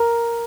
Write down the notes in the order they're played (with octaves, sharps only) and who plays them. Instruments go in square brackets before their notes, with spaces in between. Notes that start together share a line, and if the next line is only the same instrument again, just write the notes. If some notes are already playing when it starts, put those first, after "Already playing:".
Already playing: [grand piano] A#4